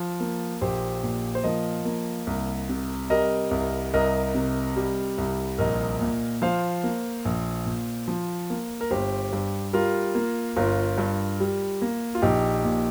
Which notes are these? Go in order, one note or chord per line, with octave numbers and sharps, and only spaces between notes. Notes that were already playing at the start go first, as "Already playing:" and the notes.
Already playing: F3
A#3
A#1 G4 C5
A#2
C5
F3 A#4 D#5
A#3
C2
C3
G3 A#4 D#5
C2
C2 A#4 D#5
C3
G3
C2
A#1 A#4 D#5
A#2
F3 C5 F5
A#3
A#1
A#2
F3
A#3
A#4
G1 G4 C5
G2
G3 F4 A#4
A#3
G1 F4 A#4
G2
G3
A#3
F4
A#1 D#4 G4
A#2